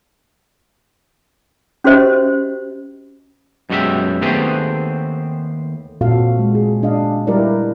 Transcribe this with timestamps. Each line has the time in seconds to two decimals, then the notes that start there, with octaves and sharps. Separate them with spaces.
1.84 C#4 F#4 G4 C5 D#5
3.70 F#2 B2 G#3 F#4 G4 E5
4.21 D#2 A3 B3 C4 G4 G#4
6.01 A#2 C4 F4 F#4 A4 F5
6.39 G#3
6.55 G#4
6.83 D4 D#5 F5
7.27 G3 E4 G4 A#4 B4 D5